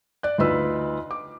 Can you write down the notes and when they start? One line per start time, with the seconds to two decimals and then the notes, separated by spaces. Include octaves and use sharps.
0.23 D5 F#6
0.38 D2 D#4 F4 B4 E6
1.11 D6